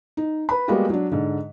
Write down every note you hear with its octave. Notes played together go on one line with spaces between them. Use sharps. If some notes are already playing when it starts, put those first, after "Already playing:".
D#4
B4 B5
G3 G#3 A#3 B3 F#4 G4
F#3 D4
G#2 D3